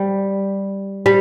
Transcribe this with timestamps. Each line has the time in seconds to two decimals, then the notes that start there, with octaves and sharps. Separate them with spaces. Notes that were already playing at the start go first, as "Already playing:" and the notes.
Already playing: G3
1.06 G3